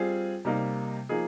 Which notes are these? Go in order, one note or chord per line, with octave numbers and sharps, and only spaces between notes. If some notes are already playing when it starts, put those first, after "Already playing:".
Already playing: G3 C4 F4 G#4
C3 G3 A#3 D#4
F3 A#3 D#4 G#4